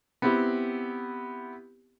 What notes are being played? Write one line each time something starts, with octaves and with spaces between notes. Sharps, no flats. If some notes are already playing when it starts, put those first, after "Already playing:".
B3 C4 E4 G4